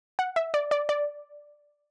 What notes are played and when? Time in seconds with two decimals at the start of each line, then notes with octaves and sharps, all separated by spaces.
0.19 F#5
0.36 E5
0.54 D5
0.71 D5
0.89 D5